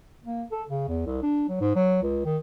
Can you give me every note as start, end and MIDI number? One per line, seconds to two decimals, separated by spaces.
0.24 0.44 58
0.52 0.63 69
0.69 0.84 49
0.88 1.02 40
1.06 1.22 36
1.23 1.44 62
1.49 1.57 54
1.61 1.74 44
1.76 2.00 54
2.03 2.24 37
2.25 2.37 51